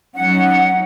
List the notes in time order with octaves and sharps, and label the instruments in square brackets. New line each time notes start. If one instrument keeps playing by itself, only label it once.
[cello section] F#3 C#4 D#4 [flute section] F#5